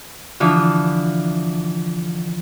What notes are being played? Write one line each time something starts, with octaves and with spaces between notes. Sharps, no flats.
D3 E3 F3